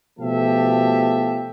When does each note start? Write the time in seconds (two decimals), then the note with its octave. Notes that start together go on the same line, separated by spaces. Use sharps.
0.19 B2 F3 A3 G4 E5 A5